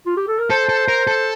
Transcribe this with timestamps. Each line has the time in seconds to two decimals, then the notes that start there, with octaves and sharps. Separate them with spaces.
0.06 F4
0.17 G4
0.28 A4
0.39 A#4
0.50 A4 C5
0.69 A4
0.88 A#4
1.07 A4